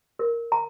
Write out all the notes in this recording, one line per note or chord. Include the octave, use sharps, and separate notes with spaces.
A#4
A#5